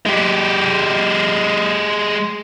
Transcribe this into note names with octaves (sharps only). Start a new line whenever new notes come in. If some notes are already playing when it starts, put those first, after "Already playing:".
G#3 G4